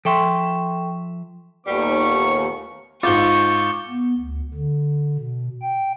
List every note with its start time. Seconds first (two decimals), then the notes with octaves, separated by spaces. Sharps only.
0.05 F3 A4 E5 G5 C6 C#6
1.67 D#2 A#2 G3 A3 B3 C#6
3.03 G#2 F4 C#6 D6 G6 G7
3.89 B3
4.18 D2
4.54 D3
5.17 B2
5.62 G5